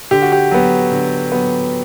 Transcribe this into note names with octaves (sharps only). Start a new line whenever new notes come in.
D3 G4
F#4
G4
F#3 B3
D3
F#3 B3